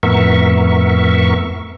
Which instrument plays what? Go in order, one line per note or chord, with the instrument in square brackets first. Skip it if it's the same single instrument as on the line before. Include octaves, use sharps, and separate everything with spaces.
[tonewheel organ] F2 A2 B3 A#4 E5 C#6